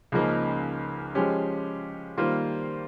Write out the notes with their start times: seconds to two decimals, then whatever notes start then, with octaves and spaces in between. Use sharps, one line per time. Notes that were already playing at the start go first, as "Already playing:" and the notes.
0.12 C#2 C#3 F3 A#3 D#4
1.15 F3 G#3 C#4 G4
2.18 D#3 G3 A#3 F4 C5